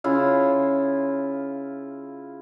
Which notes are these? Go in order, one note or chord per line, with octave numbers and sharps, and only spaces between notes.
C#3 E4 F4